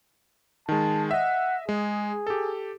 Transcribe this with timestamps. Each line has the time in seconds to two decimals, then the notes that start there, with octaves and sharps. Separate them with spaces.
0.69 D#3 G#3 A5
1.11 D#5 E5 F#5
1.69 G#3 G#4
2.27 G4 A4